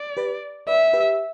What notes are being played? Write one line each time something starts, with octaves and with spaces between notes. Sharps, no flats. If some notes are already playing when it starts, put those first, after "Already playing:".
Already playing: D5
G4 B4
B4 D5 E5
G4 B4